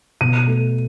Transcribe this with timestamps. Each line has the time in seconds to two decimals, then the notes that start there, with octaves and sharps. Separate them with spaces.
0.21 B2 D#7
0.47 A3